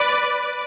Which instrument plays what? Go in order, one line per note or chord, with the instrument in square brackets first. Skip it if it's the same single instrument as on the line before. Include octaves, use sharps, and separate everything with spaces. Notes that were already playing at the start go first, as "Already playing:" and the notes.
Already playing: [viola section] B4 D5